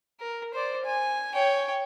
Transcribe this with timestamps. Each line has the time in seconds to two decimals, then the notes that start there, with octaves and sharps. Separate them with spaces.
0.20 A#4
0.54 C5 D5
0.85 G#5
1.34 C#5 G5